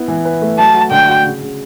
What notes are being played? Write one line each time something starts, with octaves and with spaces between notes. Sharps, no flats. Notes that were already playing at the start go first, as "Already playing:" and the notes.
Already playing: B3 E4
E3
B4
A3
F#3 A5
F#4
D3 G5
F#4
C#3
C#3